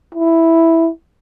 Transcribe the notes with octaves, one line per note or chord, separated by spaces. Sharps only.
E4